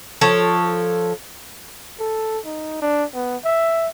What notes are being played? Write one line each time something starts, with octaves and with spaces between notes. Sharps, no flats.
F3 A4 C#5
A4
D#4
D4
B3
E5